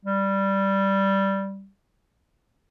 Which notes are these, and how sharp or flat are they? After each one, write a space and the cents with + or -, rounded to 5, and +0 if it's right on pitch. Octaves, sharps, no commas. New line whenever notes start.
G3 -5